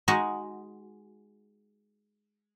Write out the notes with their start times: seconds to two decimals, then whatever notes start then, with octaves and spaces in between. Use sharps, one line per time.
0.08 G#3 D#4 F#4